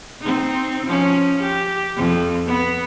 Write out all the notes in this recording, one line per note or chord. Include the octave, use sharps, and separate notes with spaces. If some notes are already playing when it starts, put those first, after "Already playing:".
C4 D#4
F3 C#4
G4
F2
B3